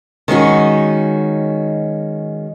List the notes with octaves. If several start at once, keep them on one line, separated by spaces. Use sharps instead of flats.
D#3 G#3 C#4 F#4